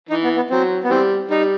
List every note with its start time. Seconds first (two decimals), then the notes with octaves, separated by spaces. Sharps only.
0.09 E3 D#4
0.24 B3
0.36 B3
0.50 F#3 C4
0.84 B3
0.90 E3 G3 C4
1.30 G3 D#4